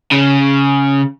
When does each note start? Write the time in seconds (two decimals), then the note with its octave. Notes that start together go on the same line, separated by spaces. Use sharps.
0.11 C#3